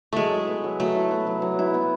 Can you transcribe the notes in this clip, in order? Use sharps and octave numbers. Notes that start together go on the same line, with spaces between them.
F#3 G#3 A3
E4
B3
F#3
F#3 A3
E4
B3
F#3
F#3
E4
B3